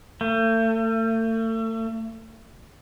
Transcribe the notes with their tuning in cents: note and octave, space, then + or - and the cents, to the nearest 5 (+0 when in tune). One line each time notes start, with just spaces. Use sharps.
A3 +35